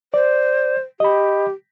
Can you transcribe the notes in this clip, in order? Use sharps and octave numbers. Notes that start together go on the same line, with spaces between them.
C5 D5
G4 D#5 B5